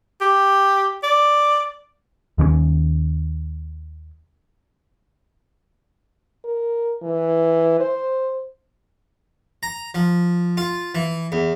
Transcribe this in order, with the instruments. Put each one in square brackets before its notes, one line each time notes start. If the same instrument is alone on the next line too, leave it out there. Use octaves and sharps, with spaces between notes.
[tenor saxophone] G4
D5
[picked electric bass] D#2 D#3 A3 C#4
[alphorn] A#4
E3
C5
[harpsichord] A#5
F3
F4
E3
E2